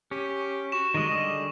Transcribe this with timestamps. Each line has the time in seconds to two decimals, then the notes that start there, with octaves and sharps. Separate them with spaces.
0.11 C#4 G4
0.72 F#4 C#6 E7
0.94 D#3 G3 G#3 D#5
1.11 D3 G3 G#4